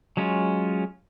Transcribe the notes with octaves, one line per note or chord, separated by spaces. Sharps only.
F#3 G#3 C#4 F4